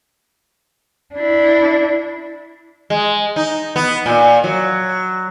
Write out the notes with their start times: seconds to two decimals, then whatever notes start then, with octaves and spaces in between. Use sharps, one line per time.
1.15 D4 E4
2.90 G#3
3.36 D#4
3.76 B3
4.06 A#2
4.44 F#3